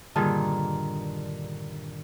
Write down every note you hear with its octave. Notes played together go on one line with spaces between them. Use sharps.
G2 A#2 D3 D#3 G#4 A5